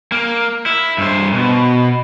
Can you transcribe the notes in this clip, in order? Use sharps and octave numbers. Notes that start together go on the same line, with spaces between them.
A#3
E4
G2 C5
B2